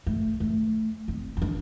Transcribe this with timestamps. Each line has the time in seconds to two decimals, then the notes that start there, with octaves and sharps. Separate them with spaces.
0.06 A3
0.40 A3
1.08 C4
1.37 C4
1.42 D4